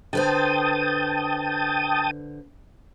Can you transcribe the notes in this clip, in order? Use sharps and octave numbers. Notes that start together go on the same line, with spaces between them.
D3 B4 C5 G5 A5 D#6